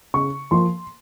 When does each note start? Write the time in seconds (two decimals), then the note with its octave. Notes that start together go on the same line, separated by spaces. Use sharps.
0.14 C#3 C#6
0.51 F3 A#3 C6